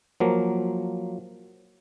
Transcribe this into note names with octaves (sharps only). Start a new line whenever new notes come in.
F3 F#3 A#3